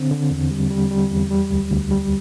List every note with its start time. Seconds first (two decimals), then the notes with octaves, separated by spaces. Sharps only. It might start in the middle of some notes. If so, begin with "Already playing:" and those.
Already playing: D3 C4
0.11 D3
0.31 E2
0.51 G3
0.70 G3
0.91 G3
1.11 E2
1.31 G3
1.51 D2
1.71 D2
1.91 G3